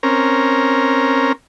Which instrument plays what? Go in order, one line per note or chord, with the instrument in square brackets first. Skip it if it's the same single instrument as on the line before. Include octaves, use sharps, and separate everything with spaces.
[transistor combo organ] C4 C#4 A#4